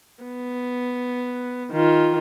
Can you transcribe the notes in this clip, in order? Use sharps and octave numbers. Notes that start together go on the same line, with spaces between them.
B3
D#3 F4